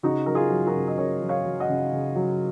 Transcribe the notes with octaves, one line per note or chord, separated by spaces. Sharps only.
C#3 D#4 F#4
F#3 A#4
F4 G#4
F#3
F#4 A#4
C#3
D#5
C#3 A#4 C#5
F#3
C#5 F5
F#3
D#5 F#5
C#3
C#3
F#3